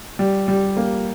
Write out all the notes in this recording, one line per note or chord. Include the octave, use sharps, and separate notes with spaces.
G3
G3
A#3